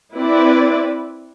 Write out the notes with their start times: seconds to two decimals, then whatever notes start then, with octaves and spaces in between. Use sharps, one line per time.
0.14 C4 E4 B4 D5